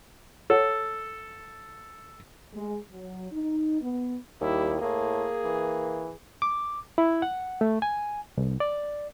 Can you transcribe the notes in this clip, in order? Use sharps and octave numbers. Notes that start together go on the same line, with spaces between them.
A4 C#5 F#5
G#3
F#3
D#4
B3
D#2 G3 E4
A2 A#3 G#4
E3
D6
E4
F#5
A3
G#5
C2
D5